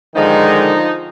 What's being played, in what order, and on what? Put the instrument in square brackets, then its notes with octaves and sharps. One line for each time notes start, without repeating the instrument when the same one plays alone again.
[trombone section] D3 D#3 G#3 [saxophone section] F3 D#4